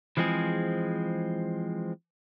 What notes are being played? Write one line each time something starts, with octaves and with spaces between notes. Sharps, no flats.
E3 F3 G#3 C4 G#4